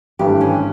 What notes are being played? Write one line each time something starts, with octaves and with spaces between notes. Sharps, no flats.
G#1 G2 E3 A3 G4
C#4